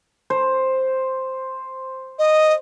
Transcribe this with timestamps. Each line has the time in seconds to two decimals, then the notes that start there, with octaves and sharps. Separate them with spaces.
0.30 C5
2.19 D#5